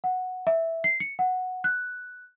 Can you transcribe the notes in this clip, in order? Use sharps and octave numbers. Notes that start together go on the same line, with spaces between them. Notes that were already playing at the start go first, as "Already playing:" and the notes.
F#5
E5
C7
C#7
F#5
F#6